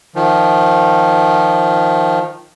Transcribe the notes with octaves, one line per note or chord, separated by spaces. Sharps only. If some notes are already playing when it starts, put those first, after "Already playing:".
D#3 F3